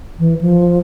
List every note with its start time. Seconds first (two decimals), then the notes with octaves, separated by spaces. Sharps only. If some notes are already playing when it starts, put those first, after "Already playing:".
0.19 E3
0.41 F3